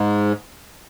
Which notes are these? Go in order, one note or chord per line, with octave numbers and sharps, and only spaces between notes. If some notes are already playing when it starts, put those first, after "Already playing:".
Already playing: G#2